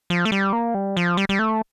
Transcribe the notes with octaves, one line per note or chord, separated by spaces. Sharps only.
F3
A3
G3
A#3
G3
F3
G3
G3
A3